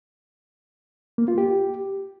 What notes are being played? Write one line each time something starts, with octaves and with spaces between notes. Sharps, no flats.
A#3
F4
G4